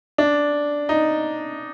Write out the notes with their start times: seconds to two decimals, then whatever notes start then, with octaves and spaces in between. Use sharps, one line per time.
0.18 D4
0.89 D#4